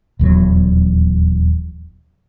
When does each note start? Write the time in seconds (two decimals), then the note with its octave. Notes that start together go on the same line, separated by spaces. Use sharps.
0.19 D#1 E2 F#3